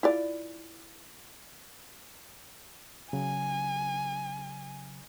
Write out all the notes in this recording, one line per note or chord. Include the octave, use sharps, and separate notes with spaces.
E4 F4 D5
C#3 F#3 G#5